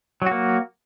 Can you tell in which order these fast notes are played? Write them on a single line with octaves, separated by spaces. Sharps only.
F#3 F#4 A#3